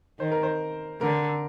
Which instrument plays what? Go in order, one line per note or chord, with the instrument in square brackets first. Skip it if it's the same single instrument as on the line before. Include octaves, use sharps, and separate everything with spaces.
[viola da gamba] D#3 [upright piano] C5
[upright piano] A#4
C5
[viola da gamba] D3 [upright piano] A#4